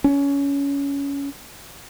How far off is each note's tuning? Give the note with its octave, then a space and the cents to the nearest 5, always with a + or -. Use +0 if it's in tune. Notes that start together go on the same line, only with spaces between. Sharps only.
C#4 +20